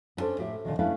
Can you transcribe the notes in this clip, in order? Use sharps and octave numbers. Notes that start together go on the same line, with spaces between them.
B3 C#4 D4 A4 C5
A2 G4 E5
A#2 D3 D#3
A3 C#4 D4 E4 B4 F5